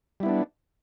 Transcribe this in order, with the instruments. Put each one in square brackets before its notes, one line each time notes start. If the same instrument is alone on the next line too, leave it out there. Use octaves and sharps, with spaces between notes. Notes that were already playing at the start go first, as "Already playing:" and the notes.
[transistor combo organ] G3
E4
B3
D4